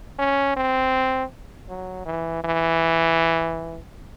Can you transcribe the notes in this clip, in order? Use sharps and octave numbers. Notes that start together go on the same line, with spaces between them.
C#4
C4
F#3
E3
E3